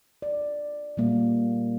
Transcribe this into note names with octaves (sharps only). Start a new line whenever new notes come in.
D5
A#2 G3 A#3